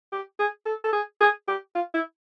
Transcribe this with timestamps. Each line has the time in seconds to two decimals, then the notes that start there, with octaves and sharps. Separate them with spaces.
0.12 G4
0.39 G#4
0.66 A4
0.84 A4
0.93 G#4
1.21 G#4
1.48 G4
1.75 F4
1.94 E4